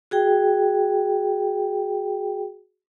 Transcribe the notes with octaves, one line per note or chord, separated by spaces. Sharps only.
F#4 G#4 G5